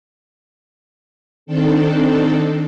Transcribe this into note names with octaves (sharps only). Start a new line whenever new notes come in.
D#3 C4 D4 A4